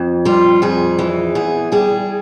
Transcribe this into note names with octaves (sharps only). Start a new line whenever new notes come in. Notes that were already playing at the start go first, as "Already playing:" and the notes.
Already playing: F2
G3 F4
F2 G#4
E3
E2 G#4
G3 G#4